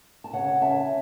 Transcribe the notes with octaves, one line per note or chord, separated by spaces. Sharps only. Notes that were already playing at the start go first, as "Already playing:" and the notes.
A5
C#3 C#5 F#5
C#4 E5 A5